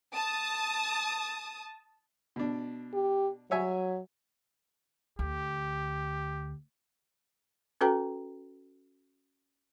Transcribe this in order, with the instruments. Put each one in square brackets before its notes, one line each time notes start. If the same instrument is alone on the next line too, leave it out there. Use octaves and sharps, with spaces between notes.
[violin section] A5 D#6
[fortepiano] B2 D4
[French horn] G4
[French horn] F#3 [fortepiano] C#5 E5 G#5
[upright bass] D2 [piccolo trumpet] G4
[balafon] C#4 F#4 A4 B4 G5 A#5